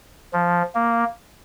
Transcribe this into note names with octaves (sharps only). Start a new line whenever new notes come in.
F3
A#3